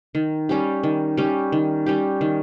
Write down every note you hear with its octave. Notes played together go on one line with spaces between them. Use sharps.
D#3
G3 C#4 G4
D#3
G3 C#4 G4
D#3
G3 C#4 G4
D#3